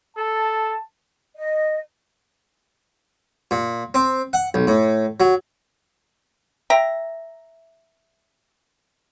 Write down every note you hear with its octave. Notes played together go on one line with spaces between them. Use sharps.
A4 A5
D#5
A#2
C4
F#5
B1
A2
F#3
E5 G5 A#5